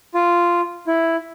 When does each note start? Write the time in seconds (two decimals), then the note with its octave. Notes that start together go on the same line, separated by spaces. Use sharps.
0.14 F4
0.87 E4